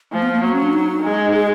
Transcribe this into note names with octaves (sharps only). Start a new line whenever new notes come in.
F3 A3
B3
A#3
F#3 A#3
C#4
D4
D#4
G#3
G#4